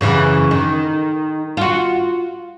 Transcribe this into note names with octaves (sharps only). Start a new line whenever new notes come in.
F#2 C#3 E3
D#3
F4 F#4